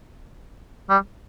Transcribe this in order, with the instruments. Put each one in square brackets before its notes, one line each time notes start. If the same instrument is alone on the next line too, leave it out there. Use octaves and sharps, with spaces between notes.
[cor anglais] G3